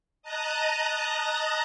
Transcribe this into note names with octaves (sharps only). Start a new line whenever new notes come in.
D#5 A5 A#5 D#6 F#6